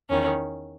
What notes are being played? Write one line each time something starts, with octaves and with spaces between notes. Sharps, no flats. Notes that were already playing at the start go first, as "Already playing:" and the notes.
E2 D#3 C#4